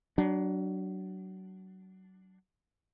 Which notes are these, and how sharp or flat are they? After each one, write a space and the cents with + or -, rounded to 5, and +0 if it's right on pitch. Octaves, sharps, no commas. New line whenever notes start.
F#3 +25 D4 +0